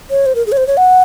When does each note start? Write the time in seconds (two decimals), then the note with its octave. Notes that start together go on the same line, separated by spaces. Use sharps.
0.10 C#5
0.26 C5
0.35 A#4
0.46 G#4
0.52 C#5
0.57 C5
0.67 C#5
0.77 F#5